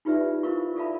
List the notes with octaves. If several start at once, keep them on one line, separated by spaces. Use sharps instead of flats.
D#4 F4 G4 B4 D5 E5
E4 F4 A#4 C5 F5 C#6
A4 D5 E5 F5 A5 B5